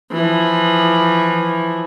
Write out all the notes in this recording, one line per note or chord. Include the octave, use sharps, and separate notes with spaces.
E3 F3